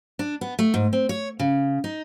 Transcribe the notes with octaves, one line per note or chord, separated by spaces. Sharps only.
D4
B3
A3
G#2
C4
C#5
C#3
D#4